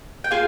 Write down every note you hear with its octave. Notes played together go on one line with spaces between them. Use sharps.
G5
A#3 F4 G#4 G#5